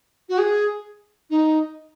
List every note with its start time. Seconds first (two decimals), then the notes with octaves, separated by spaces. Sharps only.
0.29 F#4
0.38 G#4
1.30 D#4